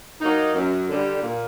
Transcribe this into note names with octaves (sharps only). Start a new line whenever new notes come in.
F#3 A#3 D#4
F#2
D3 G3
A#2